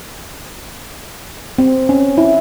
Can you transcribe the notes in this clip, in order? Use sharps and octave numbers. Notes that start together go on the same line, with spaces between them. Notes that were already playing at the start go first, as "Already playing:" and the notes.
C4
C#4
E4